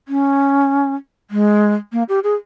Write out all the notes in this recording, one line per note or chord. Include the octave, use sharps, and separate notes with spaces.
C#4
G#3
A#3
G4
G#4